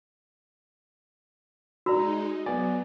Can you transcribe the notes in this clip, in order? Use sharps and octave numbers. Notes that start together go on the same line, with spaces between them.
G#3 D#4 F#4 D5 A#5 E6
F#3 B3 D5 G#5